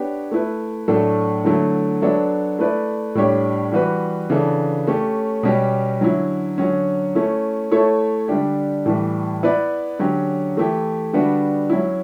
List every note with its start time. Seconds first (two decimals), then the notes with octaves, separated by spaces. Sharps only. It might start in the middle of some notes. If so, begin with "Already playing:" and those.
Already playing: B3 D4 G4 C#5
0.31 A3 E4 B4
0.88 A2 F#3 A3 D4 A4
1.45 D3 F#3 A3 E4
2.02 F#3 B3 D4 A4 C#5
2.59 A3 E4 B4 D5
3.15 A2 G3 D4 G4 C#5
3.72 E3 G3 B3 F#4 B4
4.30 C#3 E3 B3 D4 A4
4.87 A3 C#4 G4 C#5
5.43 B2 G3 C#4 G4
6.01 D3 F#3 C#4 E4
6.58 D3 F#3 C#4
7.15 A3 C#4 E4
7.71 A3 E4 A4 C#5
8.28 D3 G3 D4 G4
8.86 A2 E3 G3
9.43 B3 E4 B4 D5
9.99 D3 F#3 C#4 G4
10.57 E3 A3 E4 G4
11.13 D3 G3 B3 D4 F#4
11.70 F#3 C#4 E4